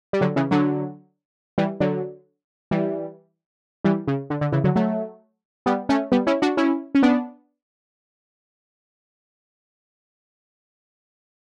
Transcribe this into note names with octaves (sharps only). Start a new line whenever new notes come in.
G3
D3 F#3
C#3 E3
D3 F#3
E3 G3
D3 F#3
E3 G3
E3 G3
C#3
D3
D3
C#3 E3
D3 F#3
F#3 A3
G3 B3
A3 C#4
G3 B3
C#4 E4
D4 F#4
C#4 E4
C#4
B3 D4